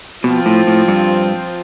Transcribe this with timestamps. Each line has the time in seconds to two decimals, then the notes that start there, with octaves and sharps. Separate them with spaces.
0.24 B2 F3 C4 F4
0.46 A2
0.67 A2
0.88 G2